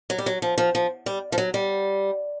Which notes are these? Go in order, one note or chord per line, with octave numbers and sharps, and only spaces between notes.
F#3
G3
F#3
F3
F3
F3
G3
F3
F#3
G3